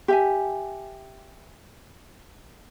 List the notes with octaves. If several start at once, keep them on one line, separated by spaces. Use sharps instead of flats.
G4 E5 G#5